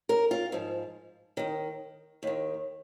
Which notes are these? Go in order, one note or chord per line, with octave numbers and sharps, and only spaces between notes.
A#4
F4
G#2 F3
D#2 D#3
D#2 D#3